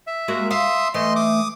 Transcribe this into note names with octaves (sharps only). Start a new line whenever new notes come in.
E5
G#3 A#3 F#4
E5 F5 C6 D#6
E3 A3 D#5 C6
D6 D#6